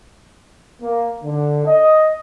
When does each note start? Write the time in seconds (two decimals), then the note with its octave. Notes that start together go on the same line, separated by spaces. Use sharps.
0.82 A#3
1.24 D3
1.66 D#5